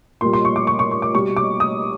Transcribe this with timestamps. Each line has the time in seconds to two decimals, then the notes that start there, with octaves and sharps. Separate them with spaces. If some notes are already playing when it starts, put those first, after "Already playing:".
0.21 A#2 G3 C6
0.33 C6
0.45 C#6
0.56 D6
0.67 C#6
0.79 C#6
0.91 C#6
1.02 D6
1.14 B2 G3 C#6
1.37 D6
1.60 D#6